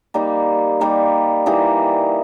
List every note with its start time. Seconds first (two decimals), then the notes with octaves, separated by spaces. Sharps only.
0.14 G3 A#3 D#4
0.80 G3 A#3 D#4
1.46 E3 G3 A#3 D#4